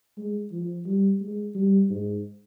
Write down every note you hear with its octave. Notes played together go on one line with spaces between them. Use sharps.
G#3
F3
G3
G#3
G3
G#2